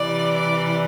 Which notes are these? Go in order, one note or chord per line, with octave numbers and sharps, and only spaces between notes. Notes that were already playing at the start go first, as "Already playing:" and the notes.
Already playing: C3 E3 G3 D5
D5